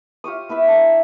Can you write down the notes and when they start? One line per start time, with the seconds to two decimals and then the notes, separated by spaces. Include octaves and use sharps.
0.24 F4 G4 C#5 D#6
0.49 B3 E4 B4 E5
0.68 D4 D5 G#5 A#5